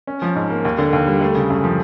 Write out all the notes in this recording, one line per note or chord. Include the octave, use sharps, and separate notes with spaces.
C#4
F3
G#2
A#3
D#2
D3
D#2
G3
A3
C#3
F#2
F3